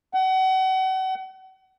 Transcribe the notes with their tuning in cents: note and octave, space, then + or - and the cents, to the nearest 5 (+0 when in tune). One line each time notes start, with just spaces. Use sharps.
F#5 +35